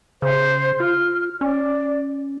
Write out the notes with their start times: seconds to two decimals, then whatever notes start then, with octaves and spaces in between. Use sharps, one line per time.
0.22 C#3 C5
0.80 F4 F6
1.41 C#4 D5